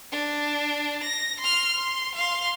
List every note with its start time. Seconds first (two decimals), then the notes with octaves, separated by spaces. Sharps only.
0.12 D4
1.03 A#6
1.40 C6 F6
1.77 C6
2.15 F5 C6